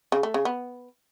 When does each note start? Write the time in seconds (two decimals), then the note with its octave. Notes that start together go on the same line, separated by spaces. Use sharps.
0.12 C#3
0.23 A3
0.34 C#3
0.45 B3